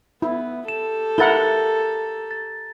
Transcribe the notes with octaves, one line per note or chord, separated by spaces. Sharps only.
B3 E4
G4 A4 E7
E4 A#4 F#5 A#5 A6 G7
A6